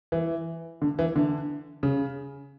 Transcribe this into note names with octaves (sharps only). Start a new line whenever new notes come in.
E3
D3
E3
D3
C#3